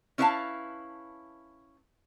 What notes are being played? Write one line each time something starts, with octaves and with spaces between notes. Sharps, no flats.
C#4 E4 B4 C#5 F5 A5